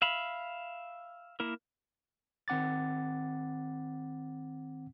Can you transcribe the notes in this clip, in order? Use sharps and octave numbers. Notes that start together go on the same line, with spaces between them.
E5 F5 B5
A#3 E4 A#4
D#3 C4 F#5 D6 A6